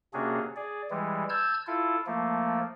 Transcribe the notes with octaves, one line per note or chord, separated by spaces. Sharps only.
C3 A#3 C#4 D4 F#4 G#4
G#4 D5
E3 G3 G#3
A5 E6 F6 G6 G#6
E4 F4 A4
F3 A3 A#3